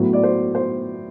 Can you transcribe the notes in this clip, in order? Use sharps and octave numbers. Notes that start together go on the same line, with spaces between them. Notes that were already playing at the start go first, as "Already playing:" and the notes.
Already playing: A2 F#3 B3
D5
C5
C5